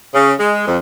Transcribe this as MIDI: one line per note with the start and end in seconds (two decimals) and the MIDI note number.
0.14 0.33 49
0.39 0.64 56
0.67 0.77 41